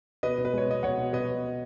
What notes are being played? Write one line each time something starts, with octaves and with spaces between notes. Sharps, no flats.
B2 B4 D#5
B2
B4
G#3 C#5
B2 D#5
B2 C#5 F#5
B2
B2 B4 D#5